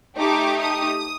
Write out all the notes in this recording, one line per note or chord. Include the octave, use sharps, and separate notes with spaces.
A3 D#4 G4 D6
D#6